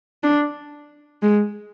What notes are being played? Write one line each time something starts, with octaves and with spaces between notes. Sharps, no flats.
D4
G#3